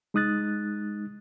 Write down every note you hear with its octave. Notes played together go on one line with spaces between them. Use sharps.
G#3 D#4 D#6 F#6 A6